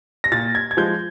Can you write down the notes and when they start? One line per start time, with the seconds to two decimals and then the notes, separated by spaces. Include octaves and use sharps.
0.24 A#6
0.32 A#2 A6
0.55 G#6
0.71 G#6
0.77 F3 G#3 G6